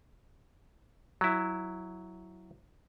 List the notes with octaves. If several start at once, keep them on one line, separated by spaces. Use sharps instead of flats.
F#3 E4